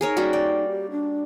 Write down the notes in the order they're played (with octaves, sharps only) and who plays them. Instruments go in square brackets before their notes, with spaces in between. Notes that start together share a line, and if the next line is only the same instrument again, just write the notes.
[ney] D#4 [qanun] G#4 A#4 C#5
[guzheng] G3 A#3 C#4 [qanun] F#4
[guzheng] D5 G5
[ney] G4
D4